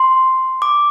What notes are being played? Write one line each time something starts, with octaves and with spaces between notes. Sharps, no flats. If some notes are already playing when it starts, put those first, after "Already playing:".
Already playing: C6
D6